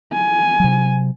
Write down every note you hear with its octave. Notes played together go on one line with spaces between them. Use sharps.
G#5
C3 F#3